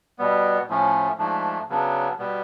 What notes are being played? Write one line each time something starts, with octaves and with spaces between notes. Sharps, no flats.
B2 G3 B3
A2 F3 A3 C#4
G#2 F3 A3 D4
C#3 F#3 B3 D4
B2 G3 B3